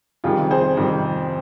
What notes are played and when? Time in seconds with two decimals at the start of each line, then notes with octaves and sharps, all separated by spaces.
0.24 F2 C3 D#3 G3 F4 G#4
0.50 G#4 C5
0.77 F2 C3 D#3 G3